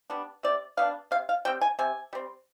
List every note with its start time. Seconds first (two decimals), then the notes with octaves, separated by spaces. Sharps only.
0.10 G3 B3 D4
0.43 C3 D5
0.77 G3 B3 D4 F5
1.11 C3 F5
1.29 F5
1.45 G3 C4 G5
1.61 G#5
1.79 C3 G#5
2.13 G3 C4